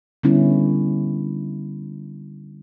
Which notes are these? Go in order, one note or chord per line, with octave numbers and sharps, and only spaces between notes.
D3 G3 B3 C#4 E4